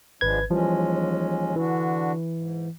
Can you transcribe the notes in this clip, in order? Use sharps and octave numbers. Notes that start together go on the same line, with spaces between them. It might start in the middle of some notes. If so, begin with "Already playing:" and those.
G#1 F3 G#3 D4 B4 G#6
D#2 E3 F3 G3 G#3 C#4
D3 E3 D4 F#4
G#2